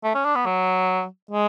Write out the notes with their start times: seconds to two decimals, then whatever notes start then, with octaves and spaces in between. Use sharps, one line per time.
0.04 A3
0.14 C#4
0.25 D4
0.35 B3
0.46 F#3
1.31 G#3